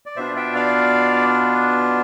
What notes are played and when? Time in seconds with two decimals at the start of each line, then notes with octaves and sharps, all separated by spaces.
0.06 D5
0.16 B2 B3 D4 F4 C5 E5
0.36 E5 G5
0.55 D5 F5